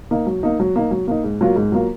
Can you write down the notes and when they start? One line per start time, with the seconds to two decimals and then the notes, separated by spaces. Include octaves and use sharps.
0.11 A#3 D#4
0.27 F#3
0.43 A#3 D#4
0.60 F#3
0.76 A#3 D#4
0.91 F#3
1.07 A#3 D#4
1.24 G#2
1.41 F#3 A#3 F4 A#4
1.56 G#2
1.72 F#3 A#3 F4 A#4